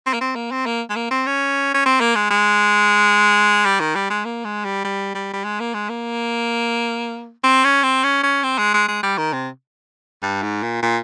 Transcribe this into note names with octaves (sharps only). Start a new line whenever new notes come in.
C4
A#3
C4
A#3
C4
A#3
G#3
A#3
C4
C#4
C#4
C4
A#3
G#3
G#3
G3
D#3
G3
G#3
A#3
G#3
G3
G3
G3
G3
G#3
A#3
G#3
A#3
C4
C#4
C4
C#4
C#4
C4
G#3
G#3
G#3
G3
D#3
C3
G2
G#2
A#2
A#2